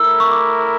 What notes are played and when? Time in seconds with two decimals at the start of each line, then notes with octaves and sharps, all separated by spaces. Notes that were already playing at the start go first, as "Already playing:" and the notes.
Already playing: A3 E4 A#4 E6
0.20 C#6
0.31 D6